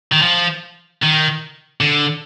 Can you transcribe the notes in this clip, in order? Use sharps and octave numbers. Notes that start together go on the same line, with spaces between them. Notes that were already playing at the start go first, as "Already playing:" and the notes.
D#3
F3
D#3
D3